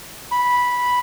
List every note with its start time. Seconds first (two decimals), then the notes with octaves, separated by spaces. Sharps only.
0.31 B5